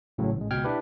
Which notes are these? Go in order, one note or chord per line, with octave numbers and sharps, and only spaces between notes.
A1 A2 C#3 F#3
A1 G#3
C#2 B2 G5 F6 G#6
D4 E4 G4 B4